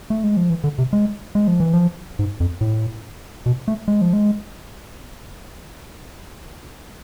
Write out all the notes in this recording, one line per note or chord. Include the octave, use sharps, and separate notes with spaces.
A3
G#3
F3
E3
D3
C3
G#3
G#3
F3
E3
F3
G#2
F2
A2
B2
A3
G#3
F3
G#3